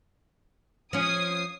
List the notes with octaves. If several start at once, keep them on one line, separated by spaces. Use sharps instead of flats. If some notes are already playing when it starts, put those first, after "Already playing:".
F3 C#4 D#6 G#6 C7